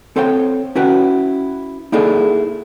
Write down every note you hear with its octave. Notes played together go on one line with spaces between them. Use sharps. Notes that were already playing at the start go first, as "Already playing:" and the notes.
C4 A4 C5 C#5 G5
C#4 E4 F#4 B4 G5
A#3 D#4 E4 G#4 A4 D5